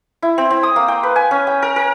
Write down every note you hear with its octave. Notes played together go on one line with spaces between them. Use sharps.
E4
C4
C4
D#6
A#3
G5
B4
G#5
C#4
G5
A#4
A#4